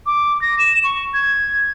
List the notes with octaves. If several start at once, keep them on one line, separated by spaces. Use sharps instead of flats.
D6
A#6
E7
C#6
G#6